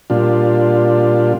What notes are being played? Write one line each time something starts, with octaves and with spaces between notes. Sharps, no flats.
A#2 G3 D4 F4